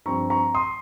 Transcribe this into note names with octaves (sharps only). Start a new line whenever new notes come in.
G2 F3 C4 A#5 C#6
A#5 C#6
C6 D#6